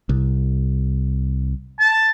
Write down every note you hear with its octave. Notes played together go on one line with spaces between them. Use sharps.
C2
A5